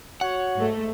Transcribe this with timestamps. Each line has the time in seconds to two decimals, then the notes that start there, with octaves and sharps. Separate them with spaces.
0.21 F#4 C#5 F#5
0.59 G#2 A3